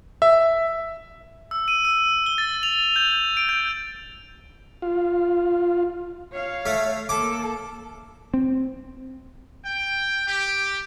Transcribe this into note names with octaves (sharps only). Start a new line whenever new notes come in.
E5
E6
D#7
E6
G7
A6
F7
G6
D7
G6
F4
C#5 F5
A3
A#3 A4 D6
C4
G5
G4